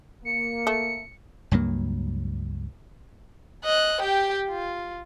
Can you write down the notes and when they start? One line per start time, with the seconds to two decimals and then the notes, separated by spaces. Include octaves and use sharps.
0.25 A#3 C#7
0.67 A3
1.51 C#2 G2 F#3 A#3
3.65 D#5 F#6
4.01 G4 G5
4.50 F4